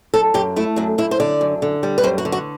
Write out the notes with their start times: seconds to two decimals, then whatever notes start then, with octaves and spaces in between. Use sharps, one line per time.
0.14 F#2 A4
0.34 F#2 G4
0.56 A3 E4
0.76 F#2 D4
0.98 F#2 E4
1.11 C5
1.20 D3 D5
1.41 F#2
1.62 D3
1.83 G3
1.98 B4
2.04 F#2 C5
2.18 F#4
2.25 D3
2.32 F#4